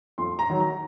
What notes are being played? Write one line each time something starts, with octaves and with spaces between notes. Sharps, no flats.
F2 C6
A#5
D#3 F#3
A#5